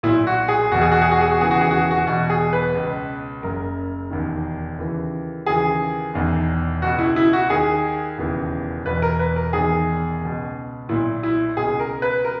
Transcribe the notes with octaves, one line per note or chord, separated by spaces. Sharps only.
B1 A#2 E4
F#4
G#4
E1 E2 B2 F#4
G#4
F#4
G#4
F#4
G#4
F#4
E1 D#2 C#3 E3 G#4
F#4
G#4
F#4
G#4
F#4
E1 E2 B2 F#4
G#4
B4
C#2 B2
F#1 F#2 C#3 A#4
E1 D#2 D#3
D#2 C#3 E3
D#2 C#3 E3 G#4
E1 E2 D#3
C#2 B2 F#4
E4
E4
F#4
D#2 D#3 G#4
E1 D#2 C#3 E3
E1 E2 B2 B4
A#4
B4
A#4
E1 E2 D#3 G#4
C#2 B2
B1 A#2 E4
E4
C#2 B2 G#4
A#4
B4
A#4